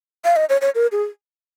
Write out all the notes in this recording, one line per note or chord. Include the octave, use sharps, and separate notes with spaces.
F5
D#5
C#5
C#5
A#4
G#4